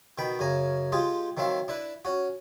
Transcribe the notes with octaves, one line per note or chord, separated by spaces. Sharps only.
B2 D#3 G5 B5
F#2 C#3 G#5 A#5
G#3 F4 G4 G#4
D#3 F#3 C4 E5 F5
D4 E4 B4
C#4 F#4